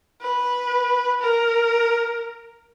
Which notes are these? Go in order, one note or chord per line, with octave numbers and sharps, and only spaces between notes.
B4
A#4